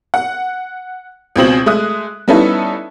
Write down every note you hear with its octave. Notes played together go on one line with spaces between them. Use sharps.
F#5
C#2 B2 C4 F#7
G#3 A3 D#6 F#6
G3 B3 C#4 D#4 E4 A4